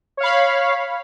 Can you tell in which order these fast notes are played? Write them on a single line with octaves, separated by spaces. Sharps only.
C#5 F5 B5